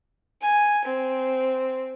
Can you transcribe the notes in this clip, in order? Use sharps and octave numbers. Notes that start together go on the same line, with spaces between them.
G#5
C4